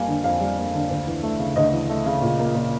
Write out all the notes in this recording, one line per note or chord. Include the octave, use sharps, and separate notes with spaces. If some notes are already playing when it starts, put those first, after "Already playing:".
Already playing: F2 G3 A#3 F5 G#5
D3
F2 F5
G3
A#3
D3
D2
E3
A3
C#3
D2 D#5
E3
A3
C#3
A#2
A#3
A#2